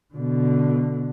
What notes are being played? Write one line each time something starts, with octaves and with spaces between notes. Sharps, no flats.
B2 D3